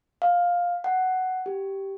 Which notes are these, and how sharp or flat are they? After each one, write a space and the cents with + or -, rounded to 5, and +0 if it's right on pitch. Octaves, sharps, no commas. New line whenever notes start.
F5 +10
F#5 +10
G4 -10